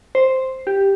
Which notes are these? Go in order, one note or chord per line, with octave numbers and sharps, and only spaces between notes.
C5
G4